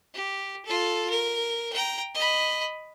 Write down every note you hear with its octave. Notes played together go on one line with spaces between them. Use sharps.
G4
F4 A4
A#4
G5 A#5
D#5 B5